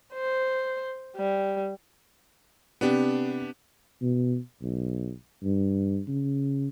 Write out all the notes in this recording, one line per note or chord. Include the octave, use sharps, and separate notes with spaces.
C5
G3
C3 B3 D4 G4
B2
B1
G2
C#3